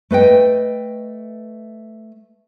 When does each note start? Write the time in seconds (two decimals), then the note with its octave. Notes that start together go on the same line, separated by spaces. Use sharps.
0.11 A3 B4 D#5 G5